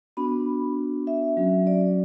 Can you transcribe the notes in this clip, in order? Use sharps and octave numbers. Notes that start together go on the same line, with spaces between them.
B3 D4 F#4 B5
E5
F#3 C#4 F#4
D5